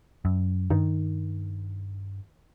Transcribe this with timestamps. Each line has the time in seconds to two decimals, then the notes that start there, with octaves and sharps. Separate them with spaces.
0.25 F#2
0.70 G2 D#3